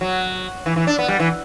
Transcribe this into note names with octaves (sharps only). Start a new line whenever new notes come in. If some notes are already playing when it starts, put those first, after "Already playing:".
F#3
E3
E3
D4
B3
G3
E3